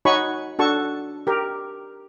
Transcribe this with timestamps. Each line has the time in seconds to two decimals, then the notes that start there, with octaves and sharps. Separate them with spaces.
0.05 D#4 F#4 C#5 G#5 B5 C#6
0.59 D4 F#4 A4 A5 C#6
1.27 G4 A#4